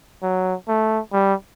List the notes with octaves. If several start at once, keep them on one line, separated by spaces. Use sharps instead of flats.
F#3
A3
G3